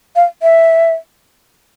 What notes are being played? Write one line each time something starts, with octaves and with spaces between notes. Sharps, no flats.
F5
E5